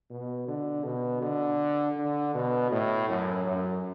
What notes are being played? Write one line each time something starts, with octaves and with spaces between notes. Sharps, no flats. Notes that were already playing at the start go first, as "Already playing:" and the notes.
B2
D3
B2
D3
D3
B2
A2
F#2
F#2